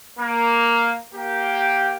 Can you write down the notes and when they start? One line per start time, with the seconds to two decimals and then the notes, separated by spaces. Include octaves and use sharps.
0.17 A#3
1.13 A#3 G4